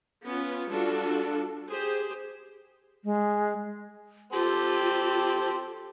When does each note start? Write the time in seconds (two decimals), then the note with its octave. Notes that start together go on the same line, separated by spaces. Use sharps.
0.24 B3 C#4 F4
0.70 G3 D4 F4 F#4 A4
1.68 G4 G#4 C5
3.04 G#3
4.33 C4 F4 G4 A4 C5